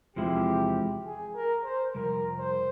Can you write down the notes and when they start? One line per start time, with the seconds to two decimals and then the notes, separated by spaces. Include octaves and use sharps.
0.16 E2 C3 F3 G#3 E4 G4
1.06 G#4
1.35 A#4
1.64 C5
1.95 F2 C3 G3 A#4
2.39 C5